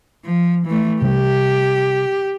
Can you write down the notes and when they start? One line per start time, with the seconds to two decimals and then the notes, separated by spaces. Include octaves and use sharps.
0.25 F3
0.66 E3 A3
1.02 C3 G3 G4